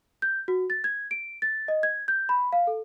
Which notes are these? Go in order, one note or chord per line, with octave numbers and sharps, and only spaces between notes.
G6
F#4
A6
G#6
D7
A6
D#5
G#6
G6
B5
F5
A4